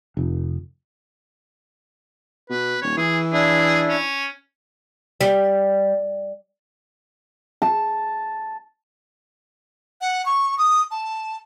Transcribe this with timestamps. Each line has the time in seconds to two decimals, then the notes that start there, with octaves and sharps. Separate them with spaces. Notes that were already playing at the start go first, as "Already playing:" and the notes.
0.17 F1
2.50 B2 B4
2.82 D#1 C#5
2.97 E3 G#4
3.33 D4 E4 G#4
3.89 C#4
5.21 G3
7.62 A5
10.01 F#5
10.26 C#6
10.58 D#6
10.91 A5